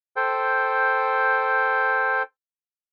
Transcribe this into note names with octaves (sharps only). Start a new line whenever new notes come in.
A4 C5 G5